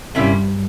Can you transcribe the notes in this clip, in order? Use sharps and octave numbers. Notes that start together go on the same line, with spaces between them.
G2 C3 G3 A#3 C#4 E4